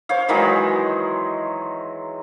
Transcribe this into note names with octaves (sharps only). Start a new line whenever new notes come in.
C5 C#5 F5
D#3 E3 F#3 G#3